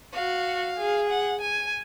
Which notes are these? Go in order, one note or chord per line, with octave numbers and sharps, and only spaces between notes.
F#4 F5
G#4
F#5
G#5